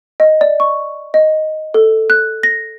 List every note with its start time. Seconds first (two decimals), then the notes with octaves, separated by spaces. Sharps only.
0.20 D#5
0.41 D5
0.60 C#6
1.14 D#5
1.74 A4
2.10 F#6
2.43 A#6